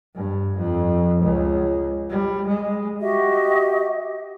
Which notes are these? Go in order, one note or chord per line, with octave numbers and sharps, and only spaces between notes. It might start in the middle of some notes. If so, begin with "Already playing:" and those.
G2
F2
C#2
G3
G#3
F#4 G4 D#5 E5